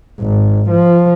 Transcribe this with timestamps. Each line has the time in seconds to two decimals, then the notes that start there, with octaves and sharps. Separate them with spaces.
0.20 G#1
0.70 F3